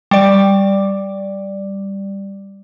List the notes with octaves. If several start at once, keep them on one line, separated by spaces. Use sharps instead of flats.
G3 D5